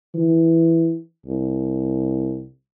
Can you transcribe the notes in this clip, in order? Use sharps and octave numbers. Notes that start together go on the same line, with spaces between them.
E3
C2